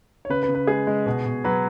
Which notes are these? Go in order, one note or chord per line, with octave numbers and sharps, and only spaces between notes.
C#5
C#3 B4
B4
C#3
B4
G#3 G#4
G#3
B2
B2
F#3 B4